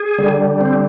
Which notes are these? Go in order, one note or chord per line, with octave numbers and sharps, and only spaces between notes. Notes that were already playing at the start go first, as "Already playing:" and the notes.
Already playing: G#4
D3 G3
C4